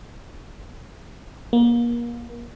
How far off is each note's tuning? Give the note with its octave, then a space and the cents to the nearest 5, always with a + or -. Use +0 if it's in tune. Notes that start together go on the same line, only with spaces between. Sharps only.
A#3 +30